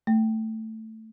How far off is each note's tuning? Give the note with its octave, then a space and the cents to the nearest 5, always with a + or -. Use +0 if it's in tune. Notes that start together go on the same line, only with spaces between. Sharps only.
A3 +10